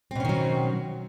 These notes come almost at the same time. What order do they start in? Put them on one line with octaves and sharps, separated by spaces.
C4 B2 C#4 D#3 F#3